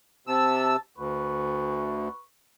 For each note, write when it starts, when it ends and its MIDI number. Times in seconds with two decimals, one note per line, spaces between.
0.27 0.76 48
0.27 0.78 81
0.27 0.76 88
0.98 2.09 38
0.98 2.22 71
0.98 2.22 85